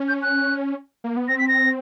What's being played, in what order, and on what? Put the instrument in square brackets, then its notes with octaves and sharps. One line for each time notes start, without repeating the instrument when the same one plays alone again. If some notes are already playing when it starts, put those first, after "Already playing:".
Already playing: [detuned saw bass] C#4
[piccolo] G6
F#6
[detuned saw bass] A#3
B3
[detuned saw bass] C4 [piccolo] A#6
[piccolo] B6
A#6